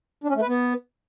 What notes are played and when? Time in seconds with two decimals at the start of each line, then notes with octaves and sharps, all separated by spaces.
0.24 D4
0.30 C#4
0.36 A3
0.42 B4
0.48 B3